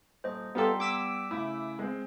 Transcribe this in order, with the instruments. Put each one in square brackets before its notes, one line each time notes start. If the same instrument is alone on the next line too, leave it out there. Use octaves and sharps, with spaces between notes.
[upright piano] D#1 [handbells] C5 D#5
[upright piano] G3 G4 [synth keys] B3 F4 A4 [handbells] A#5 C6
[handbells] B3 D7 [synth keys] D6 E6 B6
[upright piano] C#3 E4 [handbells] A3
[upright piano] G#3 C4